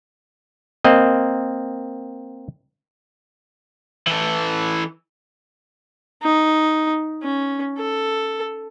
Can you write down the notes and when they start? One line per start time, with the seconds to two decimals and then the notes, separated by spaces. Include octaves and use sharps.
0.84 A#3 C4 D#5
4.07 E3 A4
6.23 D#4
7.23 C#4
7.78 A4